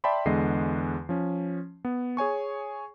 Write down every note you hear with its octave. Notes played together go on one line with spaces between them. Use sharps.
D5 E5 G5 A5 B5 C6
E2 D3 G#3 D#5 C7
F3 C#4
B3
G#4 C#5 G#5 C#6